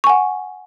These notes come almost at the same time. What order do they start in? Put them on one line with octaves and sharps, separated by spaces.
C#6 G#5 F#5